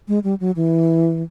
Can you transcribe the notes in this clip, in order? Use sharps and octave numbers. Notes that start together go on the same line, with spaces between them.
G#3
G3
F#3
E3